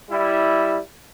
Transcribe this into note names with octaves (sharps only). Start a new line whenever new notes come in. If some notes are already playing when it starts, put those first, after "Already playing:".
G3 E4